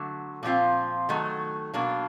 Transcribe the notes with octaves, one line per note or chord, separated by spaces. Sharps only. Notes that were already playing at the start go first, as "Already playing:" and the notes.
Already playing: D3 F#3 A3
A#2 F3 A3 C4 F4
D#3 F#3 A3
B2 F#3 A#3 D4